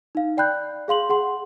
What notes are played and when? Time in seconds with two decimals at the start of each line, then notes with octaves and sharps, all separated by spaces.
0.15 D#4 F5
0.37 D5 G5 B5 F#6 G6
0.88 G#4 F5 C6 F#7
1.09 G#4 F#5 C6